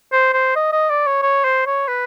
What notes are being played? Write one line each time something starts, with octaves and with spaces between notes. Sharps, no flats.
C5
C5
D#5
D#5
D5
C#5
C#5
C5
C#5
B4